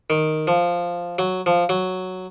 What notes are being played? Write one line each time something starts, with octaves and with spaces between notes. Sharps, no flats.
D#3
F3
F#3
F3
F#3